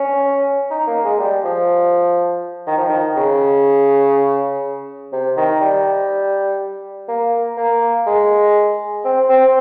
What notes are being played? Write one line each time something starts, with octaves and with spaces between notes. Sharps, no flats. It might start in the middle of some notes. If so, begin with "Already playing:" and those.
Already playing: C#4
D#4
A#3
G#3
G3
F3
D#3
F3
D#3
C#3
C3
D#3
G3
A#3
A#3
G#3
C4
C4